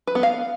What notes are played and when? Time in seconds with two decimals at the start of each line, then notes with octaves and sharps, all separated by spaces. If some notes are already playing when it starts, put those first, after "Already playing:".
0.07 B4
0.15 B3
0.23 F5